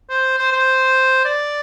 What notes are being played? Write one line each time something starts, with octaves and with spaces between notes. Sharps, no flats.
C5
C5
C5
D5